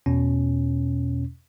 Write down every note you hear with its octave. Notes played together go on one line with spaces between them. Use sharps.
E2 B2 C#4